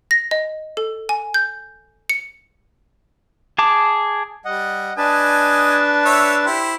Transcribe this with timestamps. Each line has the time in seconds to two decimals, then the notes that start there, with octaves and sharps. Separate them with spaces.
0.11 A#6
0.31 D#5
0.77 A4
1.09 G#5
1.34 G6
2.10 C#7
3.58 G#4 A5 D6
4.45 G3 D#5 F#5
4.98 D4 B4 D#5 G#5 A5
6.05 C#5 E5 E6
6.46 E4 G4 C5